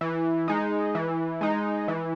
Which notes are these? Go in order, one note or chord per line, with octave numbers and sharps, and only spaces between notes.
E3
G#3 D#4
E3
G#3 D#4
E3